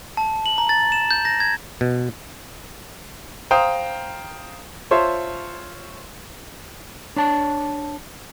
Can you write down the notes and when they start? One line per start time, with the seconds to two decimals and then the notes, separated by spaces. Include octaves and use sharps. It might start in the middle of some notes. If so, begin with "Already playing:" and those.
0.17 A5
0.46 F#7
0.58 A#5
0.69 A6
0.92 E7
1.11 G6
1.25 A#6
1.40 G#6
1.81 B2
3.51 C5 F5 G5 A#5 D#6
4.91 F4 C5 C#5 E5 A5 C6
7.16 D4 C#5 A5